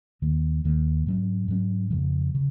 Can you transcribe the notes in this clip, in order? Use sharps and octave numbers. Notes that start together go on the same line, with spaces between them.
D#2 D#3 A#3
D#2 D#3 A#3
G#2 F#3 C#4
G#2 F#3 C#4
F2 C#3 F3
C#3